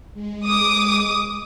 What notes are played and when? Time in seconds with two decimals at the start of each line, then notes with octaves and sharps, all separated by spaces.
0.14 G#3
0.47 D6 D#6